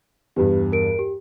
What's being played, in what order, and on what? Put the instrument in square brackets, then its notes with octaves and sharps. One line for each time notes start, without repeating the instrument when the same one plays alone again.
[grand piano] E2 G2 [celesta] G4 B4
[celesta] A#4 D7
G4